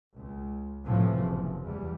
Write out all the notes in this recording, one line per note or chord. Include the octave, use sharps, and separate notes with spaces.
C#2
A2 C3 E3 F3
F#1
E2 G3